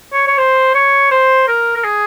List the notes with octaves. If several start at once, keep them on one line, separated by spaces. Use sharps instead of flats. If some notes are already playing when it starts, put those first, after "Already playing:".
C#5
C#5
C5
C#5
C5
A#4
A#4
G#4